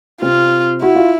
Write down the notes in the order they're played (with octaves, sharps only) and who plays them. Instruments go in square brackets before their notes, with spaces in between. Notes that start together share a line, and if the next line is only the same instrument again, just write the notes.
[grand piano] C3 C4 [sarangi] F4
[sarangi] E4 [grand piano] F#4
[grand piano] F4